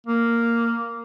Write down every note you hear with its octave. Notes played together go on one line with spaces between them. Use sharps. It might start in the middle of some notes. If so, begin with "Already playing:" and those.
A#3